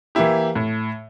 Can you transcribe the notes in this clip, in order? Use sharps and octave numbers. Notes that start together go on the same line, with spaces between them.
E3 A#3 E4 G4
A2